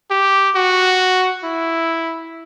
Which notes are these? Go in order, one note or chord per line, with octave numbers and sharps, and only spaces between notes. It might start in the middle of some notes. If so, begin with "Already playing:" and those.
G4
F#4
E4